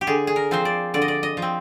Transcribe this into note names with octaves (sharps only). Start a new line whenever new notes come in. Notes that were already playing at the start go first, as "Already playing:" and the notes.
G4
D3 G#4
G#4
A#4
F3 C4 C5
D5
D3 D5
D#5
D5
D#5
F3
C4